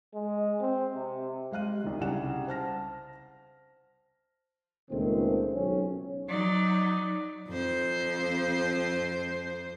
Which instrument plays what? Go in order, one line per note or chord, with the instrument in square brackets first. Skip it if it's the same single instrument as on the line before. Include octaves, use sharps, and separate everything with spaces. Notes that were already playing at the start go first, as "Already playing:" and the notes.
[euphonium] G#3
C4
C3
[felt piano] G3 G#3 F5 F#6 D#7
C2 D#3
C2 C#3 F#5 E7
C5 A5 F6 A#6
[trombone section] C#2 A#2 D#3 A3 C4
B1 C#4
[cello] F#3 [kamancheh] D#4 D5
[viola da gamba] F2 C5